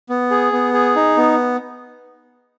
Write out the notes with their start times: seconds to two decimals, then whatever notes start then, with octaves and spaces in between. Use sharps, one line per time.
0.09 B3
0.31 G#4
0.52 B3
0.74 G#4
0.96 D#4
1.17 B3